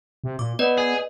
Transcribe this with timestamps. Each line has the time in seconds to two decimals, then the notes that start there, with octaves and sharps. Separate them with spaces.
0.24 C3
0.39 A#2 D6
0.59 B3 B4 D5 D#5
0.78 G#4